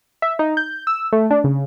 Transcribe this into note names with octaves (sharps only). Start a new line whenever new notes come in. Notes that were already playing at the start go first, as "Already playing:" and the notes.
E5
D#4
G6
E6
A3
D4
C#3